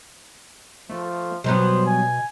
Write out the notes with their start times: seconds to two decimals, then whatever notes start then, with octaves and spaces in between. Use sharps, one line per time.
0.90 F3 A3
1.44 B2 F#3 G3 B3 C5
1.86 G#5